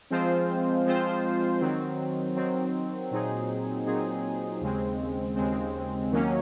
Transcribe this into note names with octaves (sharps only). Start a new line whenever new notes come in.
F3 G#3 C4 F4 C5
F3 G#3 C4 F4 C5
D#3 F#3 C4
D#3 F#3 C4
A#2 F#3 C4 D#4 G#4
A#2 F#3 C4 D#4 G#4
D#2 C#3 G#3 C4
D#2 C#3 G#3 C4
D#2 D#3 F#3 A#3 C#4